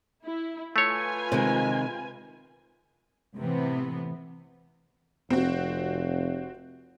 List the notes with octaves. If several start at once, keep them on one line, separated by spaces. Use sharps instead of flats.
E4
A3 F4 B4 C#5 G#5
C3 D#3 G#3
A2 C3 E3 B3
F1 C4 F#4